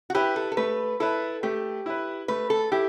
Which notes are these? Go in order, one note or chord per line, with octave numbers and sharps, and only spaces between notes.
F#4
E4 G4 B4
A4
A4
A3 B4
E4 A4 B4
A3 G4
E4 B4
A3 B4
A4
E4 G4